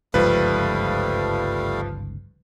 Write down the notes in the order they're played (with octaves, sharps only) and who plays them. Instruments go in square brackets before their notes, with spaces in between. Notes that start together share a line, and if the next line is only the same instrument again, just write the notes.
[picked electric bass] G1 C#2 G#2 [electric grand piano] F3 B4 [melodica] G3 A3 F5